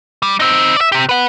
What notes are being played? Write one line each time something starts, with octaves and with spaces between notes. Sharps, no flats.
G3
C4 D#4
D5 E5
C3 G4
B4 F#5